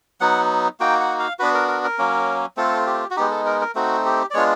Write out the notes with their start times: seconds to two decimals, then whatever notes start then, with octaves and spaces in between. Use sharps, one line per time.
0.21 F#3 B3 D#4 F#5
0.80 A#3 D#4 F#4 G5
1.00 F#5
1.19 F5
1.39 B3 D4 F#4 B4
1.54 A#4
1.68 A#4
1.84 A#4
1.99 F#3 A#3 C#4
2.57 A3 C4 F4 A4
2.87 G4
3.10 F#4
3.16 G#3 B3 D#4 G4
3.31 A4
3.46 A#4
3.61 A#4
3.75 A3 C4 D#4 F#4
4.05 G4
4.30 D5
4.34 G#3 B3 D4 F4 C#5